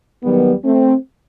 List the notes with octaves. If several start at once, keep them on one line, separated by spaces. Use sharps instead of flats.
D#2 D#3 F#3 G3 B3
A3 C4